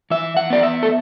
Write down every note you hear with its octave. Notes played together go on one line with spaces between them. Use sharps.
E3 E5
F#5
B3 D5
E5
A4